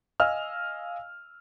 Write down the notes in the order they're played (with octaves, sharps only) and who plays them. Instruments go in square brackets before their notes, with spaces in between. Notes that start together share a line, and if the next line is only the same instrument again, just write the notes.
[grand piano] D#5 F5 G#5 E6 F6